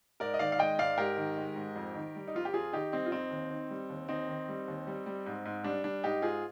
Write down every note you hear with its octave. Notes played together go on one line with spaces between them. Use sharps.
G#2 A#4 D5
D#5
D#3 D5 F5
F5
G#3 D#5 G5
G#2 D5 F5
G#2 G4 A#4
D#3
G#3
G#2
F2
D#3
G3
D#4
F2 F4
G4
F2 F4 G#4
D#3 D#4 G4
G3 C4 D#4
F4
F2 C4 D#4
D#2
D#3
G3
D#2
D#2 C4 D#4
D#3
G3
D#2
G3
G3
G#2
G#2
G3 D4
G3 D4
G#2 D#4 G4
G#2 F4 G#4